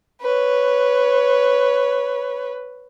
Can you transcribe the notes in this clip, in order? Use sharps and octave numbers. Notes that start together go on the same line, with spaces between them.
B4 C#5